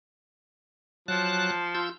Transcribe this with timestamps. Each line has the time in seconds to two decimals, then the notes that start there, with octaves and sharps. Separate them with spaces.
1.08 F3 F#3 A5 F#6
1.75 F4 E6 G6